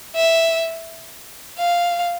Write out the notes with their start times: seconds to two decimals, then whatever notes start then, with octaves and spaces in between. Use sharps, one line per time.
0.16 E5
1.59 F5